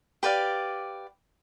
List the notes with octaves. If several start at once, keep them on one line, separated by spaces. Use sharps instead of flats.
G4 B4 D5 F5